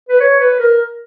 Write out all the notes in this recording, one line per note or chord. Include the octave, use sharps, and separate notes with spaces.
B4
C#5
B4
A#4